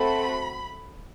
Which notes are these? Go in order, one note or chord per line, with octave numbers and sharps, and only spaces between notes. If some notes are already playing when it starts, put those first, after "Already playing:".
Already playing: A3 C4 F#4 A4 B5